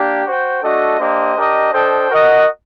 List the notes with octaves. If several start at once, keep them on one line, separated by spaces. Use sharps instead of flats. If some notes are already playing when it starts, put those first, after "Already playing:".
Already playing: A#3 D4 G4
F#4 C5 G5
A3 D4 F#4 A4 D#5
A#3 D4 G4 C5 D#5
D4 G4 A#4 D#5
D4 A4 C5 D#5 G5
F#4 A#4 D#5 F#5